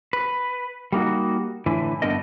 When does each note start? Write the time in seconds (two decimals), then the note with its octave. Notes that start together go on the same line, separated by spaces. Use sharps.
0.13 B4
0.92 G3 A#3 D#4 F#4
1.66 A2 D3 E3 B4
2.02 G2 D3 A3 B3 A#4 D#5